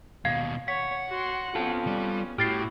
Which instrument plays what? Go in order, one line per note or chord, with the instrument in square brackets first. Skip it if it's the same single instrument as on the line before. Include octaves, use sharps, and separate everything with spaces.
[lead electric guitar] D#2 B2 [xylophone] F5 G#6 C7
[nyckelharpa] C#5 [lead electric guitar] F#5 [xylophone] B6
[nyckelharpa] F#4 C6
[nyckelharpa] B3 C#4 [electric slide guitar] F4 A4
[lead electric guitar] G3
[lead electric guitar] A2 [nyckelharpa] E4 F#4 [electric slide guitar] G4 [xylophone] F6 A6 C7